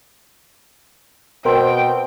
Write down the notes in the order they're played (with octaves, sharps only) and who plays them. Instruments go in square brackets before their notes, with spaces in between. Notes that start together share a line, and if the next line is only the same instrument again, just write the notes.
[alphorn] B2 [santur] C4 [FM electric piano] A#4 [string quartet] G5